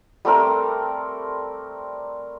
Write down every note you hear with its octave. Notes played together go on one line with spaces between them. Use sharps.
G3 A3 C4 A#4